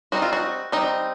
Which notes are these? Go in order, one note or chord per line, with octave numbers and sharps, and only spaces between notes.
G3 C4 D#4 F#4
F4
F#4
G3 C4 D#4